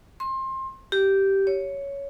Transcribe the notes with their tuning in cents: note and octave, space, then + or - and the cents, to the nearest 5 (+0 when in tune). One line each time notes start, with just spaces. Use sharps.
C6 +25
G4 -10
C#5 +10